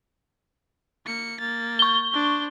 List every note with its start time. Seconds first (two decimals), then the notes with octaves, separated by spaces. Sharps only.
1.06 A#3 C#7
1.39 A#3 A6
1.79 C#6 G7
2.11 D4 C5